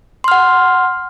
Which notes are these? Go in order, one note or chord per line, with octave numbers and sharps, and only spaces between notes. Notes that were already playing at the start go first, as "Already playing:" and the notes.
F#5 C6 F6